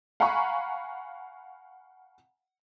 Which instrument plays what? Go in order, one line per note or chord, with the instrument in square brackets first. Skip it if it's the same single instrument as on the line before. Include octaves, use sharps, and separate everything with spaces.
[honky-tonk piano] F5 F#5 G#5 A#5 B5 C#6